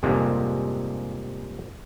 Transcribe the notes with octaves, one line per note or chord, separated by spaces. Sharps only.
F2 G#2 C3 G3 G#3 A#3